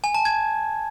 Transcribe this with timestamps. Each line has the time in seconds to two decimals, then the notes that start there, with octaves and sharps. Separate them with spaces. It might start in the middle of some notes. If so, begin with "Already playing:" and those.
0.04 G#5
0.15 A5
0.25 G#6